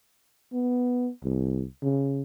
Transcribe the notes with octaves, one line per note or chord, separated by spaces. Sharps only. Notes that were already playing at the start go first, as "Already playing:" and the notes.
B3
C2
C#3